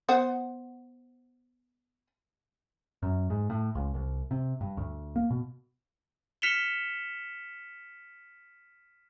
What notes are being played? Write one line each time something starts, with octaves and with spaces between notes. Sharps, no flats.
B3 C5 F#5
F#2
G#2
A2
C#2
C2
C3
G2
D2
A#3
B2
F6 B6 C#7 E7 F7 G7